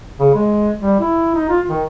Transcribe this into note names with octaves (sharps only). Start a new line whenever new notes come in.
C#3
G#3
G3
E4
D#4
F4
D#3